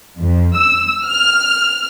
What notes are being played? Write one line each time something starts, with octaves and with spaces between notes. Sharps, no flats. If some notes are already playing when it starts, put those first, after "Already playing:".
F2
E6
F6